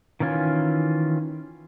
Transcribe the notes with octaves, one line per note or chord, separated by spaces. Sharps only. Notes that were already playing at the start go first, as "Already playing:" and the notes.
D#3 E3 C#4 F4 G#5